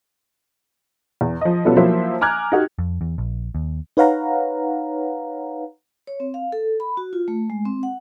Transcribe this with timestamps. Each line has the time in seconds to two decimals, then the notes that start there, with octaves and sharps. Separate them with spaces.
1.21 E2
1.41 F3 D#5
1.65 B2 G3 B3 C#4 F4 A4
1.76 F3 F#3 A#3 E4 C5 E5
2.21 G#5 A#5 D6 F6 F#6 G#6
2.52 D#4 F#4 G4
2.79 F2
3.01 E2
3.18 A#1
3.55 D#2
3.97 D#4 B4 C#5 F5 F#5 A#5
6.07 C#5
6.20 C4
6.34 F5
6.52 A4
6.80 B5
6.97 F#4
7.13 F4
7.28 A3
7.50 G#3
7.65 C4
7.83 F#5